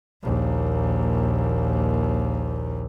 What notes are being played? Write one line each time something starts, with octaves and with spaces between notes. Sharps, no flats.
A#1 D#2